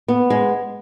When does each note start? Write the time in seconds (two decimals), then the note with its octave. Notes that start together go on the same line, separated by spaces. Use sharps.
0.08 B3
0.30 G#3